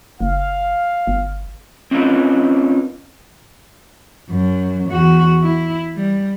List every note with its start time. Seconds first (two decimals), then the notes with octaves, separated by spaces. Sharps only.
0.21 F#1 F5
1.07 G1
1.91 C4 C#4 D#4 F4 A#4 B4
4.30 F#2 F#3
4.90 E2 F#4
5.42 E4
5.96 G3